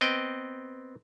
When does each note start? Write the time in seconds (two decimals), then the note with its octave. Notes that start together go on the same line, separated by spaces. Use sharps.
0.01 B3 C4 D#5 G5